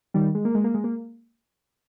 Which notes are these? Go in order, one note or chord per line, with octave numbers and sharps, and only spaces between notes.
D#3 G3
G#3
A#3
G#3
A#3
G#3
A#3